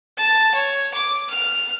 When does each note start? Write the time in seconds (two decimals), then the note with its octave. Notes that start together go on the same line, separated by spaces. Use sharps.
0.17 A5
0.54 C#5
0.94 D6
1.30 F6